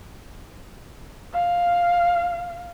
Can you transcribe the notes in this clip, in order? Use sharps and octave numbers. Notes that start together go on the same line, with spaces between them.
F5